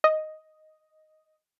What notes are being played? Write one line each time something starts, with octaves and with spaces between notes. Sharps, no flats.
D#5